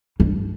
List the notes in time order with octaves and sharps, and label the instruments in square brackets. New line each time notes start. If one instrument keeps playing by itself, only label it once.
[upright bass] G2